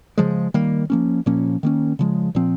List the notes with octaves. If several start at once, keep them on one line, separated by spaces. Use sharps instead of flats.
C#3 F3 G#3
D#3 G3 A#3
F3 A#3 C#4
A#2 F3 A#3 C#4
D#3 A#3 C#4
C#3 F3 G#3
A#2 F3 C4